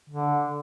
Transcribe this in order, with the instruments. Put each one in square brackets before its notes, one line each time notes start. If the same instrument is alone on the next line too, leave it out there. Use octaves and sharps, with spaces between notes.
[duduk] D3